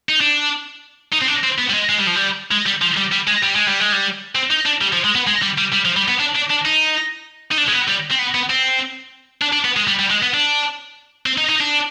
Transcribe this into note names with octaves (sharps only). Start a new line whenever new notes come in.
D#4
D4
D#4
C4
D4
C4
B3
G3
G#3
G#3
G3
F3
G3
G#3
G3
F3
G3
G3
G#3
G3
G#3
G3
G#3
G3
C4
D#4
D4
G3
F3
G#3
B3
G#3
G3
G3
G3
F3
G3
B3
D4
D4
D4
D#4
D#4
D4
G#3
B3
G3
C4
B3
B3
C4
D4
D4
B3
G#3
G3
G3
G#3
B3
D4
C4
D#4
D#4
D4